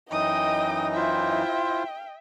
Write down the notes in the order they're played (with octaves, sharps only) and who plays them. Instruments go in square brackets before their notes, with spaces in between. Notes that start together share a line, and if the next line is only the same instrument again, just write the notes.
[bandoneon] F#2 E3 D#4 [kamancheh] D#5 G5 [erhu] D#6
[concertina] E4 F4 C5 [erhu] E5 [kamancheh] G5